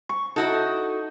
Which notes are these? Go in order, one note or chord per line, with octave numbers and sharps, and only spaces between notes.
C#6
D#4 E4 F#4 A4